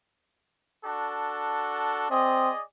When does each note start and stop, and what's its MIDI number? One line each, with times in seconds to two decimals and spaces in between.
0.85 2.08 62
0.85 2.08 66
0.85 2.08 69
2.11 2.50 60
2.11 2.62 68
2.11 2.62 74
2.11 2.62 75